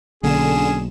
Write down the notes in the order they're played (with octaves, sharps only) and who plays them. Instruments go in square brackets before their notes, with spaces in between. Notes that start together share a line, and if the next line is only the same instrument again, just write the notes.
[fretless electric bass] B1 A#3 [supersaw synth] D3 E7 [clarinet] C#4 [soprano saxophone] G#4